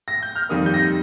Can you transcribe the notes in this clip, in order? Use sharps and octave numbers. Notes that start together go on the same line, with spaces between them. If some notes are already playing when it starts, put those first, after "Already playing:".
A#6
G6
F6
F2 D#3 G3 A#3 D#6
G6
A#6